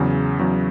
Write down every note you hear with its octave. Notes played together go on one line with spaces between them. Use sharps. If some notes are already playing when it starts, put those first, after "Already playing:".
Already playing: E2 C#3 F#3
E2 C#3 F#3